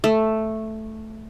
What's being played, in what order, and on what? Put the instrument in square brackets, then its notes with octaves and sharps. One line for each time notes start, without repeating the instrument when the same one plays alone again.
[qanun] A3